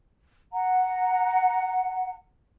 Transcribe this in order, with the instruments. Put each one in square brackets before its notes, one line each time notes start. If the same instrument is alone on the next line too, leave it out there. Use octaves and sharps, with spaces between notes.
[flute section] F#5 A#5